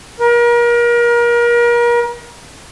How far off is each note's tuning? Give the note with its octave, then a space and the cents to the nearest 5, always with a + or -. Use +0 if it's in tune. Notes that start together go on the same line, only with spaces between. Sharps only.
A#4 +35